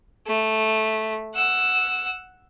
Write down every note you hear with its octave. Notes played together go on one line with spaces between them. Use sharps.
A3
F#5 E6